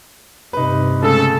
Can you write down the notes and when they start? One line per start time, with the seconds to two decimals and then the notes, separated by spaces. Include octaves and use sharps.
0.53 G2 C3 D#4 B4
1.02 C#3 A3 A4